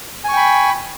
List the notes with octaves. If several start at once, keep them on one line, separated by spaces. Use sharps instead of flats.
G5 G#5 B5 C#6